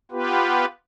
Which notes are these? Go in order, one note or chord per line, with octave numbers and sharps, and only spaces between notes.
B3 F4 G4 B4